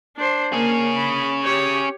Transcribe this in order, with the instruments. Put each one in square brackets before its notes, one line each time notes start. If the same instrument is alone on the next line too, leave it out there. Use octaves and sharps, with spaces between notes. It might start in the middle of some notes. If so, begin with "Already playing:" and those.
[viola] D4 C5
[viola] A#3 [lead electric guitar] C#4 G#4
[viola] B5
G4 C#5